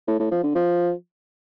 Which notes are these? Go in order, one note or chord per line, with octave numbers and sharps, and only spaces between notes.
A2
A2
F3
D3
F3